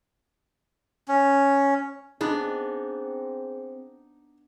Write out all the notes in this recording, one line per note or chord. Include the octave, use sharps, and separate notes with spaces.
C#4
B3 C4 D4 D#4 G#4